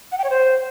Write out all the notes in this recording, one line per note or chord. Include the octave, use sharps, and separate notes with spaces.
F#5
G5
C#5
C5